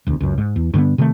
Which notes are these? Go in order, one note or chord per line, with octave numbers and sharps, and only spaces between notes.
E1 D2
C#2 F#2
G#2
E2
G2 D3 A3 B3
C3 D#3 F#3 A3